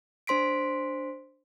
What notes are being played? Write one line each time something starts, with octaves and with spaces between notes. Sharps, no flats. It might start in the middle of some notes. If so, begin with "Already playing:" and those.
D4 C5 C6 B6 D7